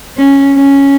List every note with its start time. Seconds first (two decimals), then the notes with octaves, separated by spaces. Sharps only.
0.17 C#4
0.56 C#4